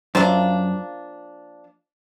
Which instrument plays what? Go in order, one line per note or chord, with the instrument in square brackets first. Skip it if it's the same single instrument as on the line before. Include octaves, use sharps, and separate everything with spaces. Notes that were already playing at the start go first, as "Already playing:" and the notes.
[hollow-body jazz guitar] F#2 [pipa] F3 A#3 D4